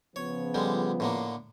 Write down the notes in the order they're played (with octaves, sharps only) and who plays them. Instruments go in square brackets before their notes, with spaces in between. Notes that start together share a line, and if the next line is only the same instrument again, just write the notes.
[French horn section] C#3 F3 B3 [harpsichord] C#5
[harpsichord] D3 G3 G#3
A2 D3 A#3